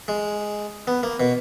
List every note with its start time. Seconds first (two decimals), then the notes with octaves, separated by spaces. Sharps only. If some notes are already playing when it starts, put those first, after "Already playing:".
0.08 G#3
0.87 B3
1.03 A#3
1.20 B2